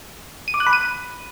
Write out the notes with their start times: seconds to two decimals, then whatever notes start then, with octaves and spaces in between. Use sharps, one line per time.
0.48 D#7
0.54 D6
0.60 F#6
0.67 B5
0.73 D#7